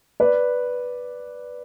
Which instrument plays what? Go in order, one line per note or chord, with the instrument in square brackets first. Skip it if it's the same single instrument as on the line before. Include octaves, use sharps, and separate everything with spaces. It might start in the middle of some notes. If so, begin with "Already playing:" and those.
[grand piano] B4 D5